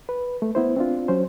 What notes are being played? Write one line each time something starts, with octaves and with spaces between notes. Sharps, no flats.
B4
A3
B3 E4 C5
C4 D4 F4
F#3 C#4 C5